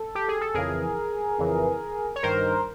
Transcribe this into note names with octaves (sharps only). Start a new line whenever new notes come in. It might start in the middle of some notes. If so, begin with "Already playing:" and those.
Already playing: A4
G4
G#4
A4
F2 C#3 E3 G#4 A#4
F2 C#3 E3
C#5
G2 D#3 A#4 C5